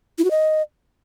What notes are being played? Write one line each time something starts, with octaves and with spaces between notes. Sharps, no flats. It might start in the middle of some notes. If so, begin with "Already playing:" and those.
E4
F#4
D#5